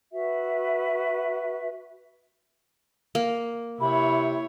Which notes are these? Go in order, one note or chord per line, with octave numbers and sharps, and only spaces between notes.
F#4 B4 E5
A#3
C3 E4 C#5 B5